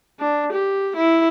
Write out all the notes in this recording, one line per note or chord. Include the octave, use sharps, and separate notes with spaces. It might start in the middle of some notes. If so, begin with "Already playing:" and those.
D4
G4
E4